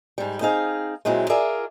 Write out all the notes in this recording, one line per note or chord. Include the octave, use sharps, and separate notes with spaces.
G#2 G3
C4 D#4 G#4 F5
A#2 F#3 G#3 C4 E4
F4 G#4 A#4 D5 E5